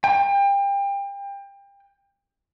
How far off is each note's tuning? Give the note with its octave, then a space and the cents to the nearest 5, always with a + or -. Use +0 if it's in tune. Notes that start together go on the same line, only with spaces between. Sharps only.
G5 +30